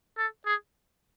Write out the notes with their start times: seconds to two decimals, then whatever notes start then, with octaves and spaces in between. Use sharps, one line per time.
0.18 A4
0.46 G#4